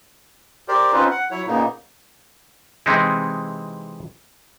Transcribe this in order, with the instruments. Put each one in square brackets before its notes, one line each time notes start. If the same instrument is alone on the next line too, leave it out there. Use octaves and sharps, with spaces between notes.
[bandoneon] G4 A#4 C5 D5
C4 C#4 D#4 F4 B4 C5
F#5
F#3 E4 C#5
A#2 C#3 A#3 B3 D#4
[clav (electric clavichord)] C3 E3 G#3 C4 D#4 E4